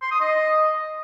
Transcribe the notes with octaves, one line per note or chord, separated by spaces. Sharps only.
C6
D#6
D#5